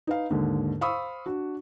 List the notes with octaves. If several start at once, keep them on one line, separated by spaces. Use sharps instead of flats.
D#4 B4 F5
D#2 G#2 D3
C5 F5 B5 C#6 D#6 E6
D4 F#4